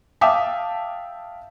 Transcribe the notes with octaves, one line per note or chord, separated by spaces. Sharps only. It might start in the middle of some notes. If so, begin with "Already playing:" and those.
E5 F5 G5 A5 D6 D#6